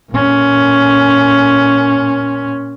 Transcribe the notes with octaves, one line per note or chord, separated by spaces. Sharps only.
A#2 C#4